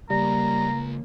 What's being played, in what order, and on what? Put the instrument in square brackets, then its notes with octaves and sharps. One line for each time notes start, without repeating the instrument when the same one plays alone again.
[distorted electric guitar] C#2 [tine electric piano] G3 [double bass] A#3 [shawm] A#5